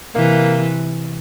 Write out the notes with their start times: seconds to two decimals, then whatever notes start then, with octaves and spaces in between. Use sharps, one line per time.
0.15 C3 E3 A#3